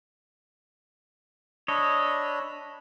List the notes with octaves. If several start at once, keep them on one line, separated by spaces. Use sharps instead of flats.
D4 C#5 D#5 B5 E6